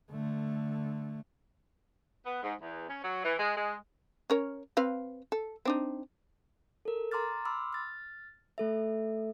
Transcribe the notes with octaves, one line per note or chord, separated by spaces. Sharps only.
D3 A3
B3
G#2
E2
C#4
F#3
E3
G#3
G#3
C#4 A#4 C#5
C4 B4 F5
A4
C4 D4 D#4
A4 A#4
A#5 C6 D6 F6 A6
B5 C6 D6 E6 F6
F6 A6
A3 A4 E5